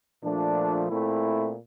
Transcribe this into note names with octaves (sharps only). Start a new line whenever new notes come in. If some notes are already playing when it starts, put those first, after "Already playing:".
A#2 F3 A3 D4
A#2 A3 C4 E4